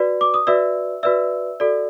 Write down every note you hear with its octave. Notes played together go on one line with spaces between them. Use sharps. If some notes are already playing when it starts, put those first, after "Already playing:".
Already playing: F#4 B4 D5
D6
D#6
F#4 B4 D5 E5 E6
F#4 B4 D5 E5 E6
F#4 A4 D5